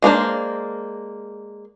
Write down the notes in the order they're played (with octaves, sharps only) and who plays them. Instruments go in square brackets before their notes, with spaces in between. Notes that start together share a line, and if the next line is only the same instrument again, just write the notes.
[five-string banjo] G#3 A#3 D4 C5